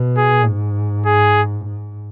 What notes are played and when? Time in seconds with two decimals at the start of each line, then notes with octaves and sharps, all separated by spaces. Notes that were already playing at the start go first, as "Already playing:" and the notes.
Already playing: B2
0.17 G#4
0.46 G#2
1.06 G#4
1.65 G#2